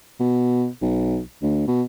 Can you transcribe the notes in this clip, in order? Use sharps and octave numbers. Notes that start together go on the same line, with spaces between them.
B2
B1
D2
B2